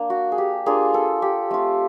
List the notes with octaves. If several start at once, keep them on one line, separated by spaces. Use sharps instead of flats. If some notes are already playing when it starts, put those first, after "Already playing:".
Already playing: A#3 D4
F#4
G#4
G4
A#3 D4 F4 G#4
A4
G4
A3 C4 F4